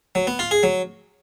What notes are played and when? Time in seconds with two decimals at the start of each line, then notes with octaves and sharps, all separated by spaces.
0.15 F#3
0.27 B3
0.39 F4
0.51 G#4
0.63 F#3